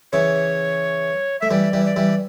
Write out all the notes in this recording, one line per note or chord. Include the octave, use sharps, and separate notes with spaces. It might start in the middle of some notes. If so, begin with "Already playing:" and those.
C#3 E3 C#5
A3 E5
E3 G3 D5
E3 G3
D5
E3 G3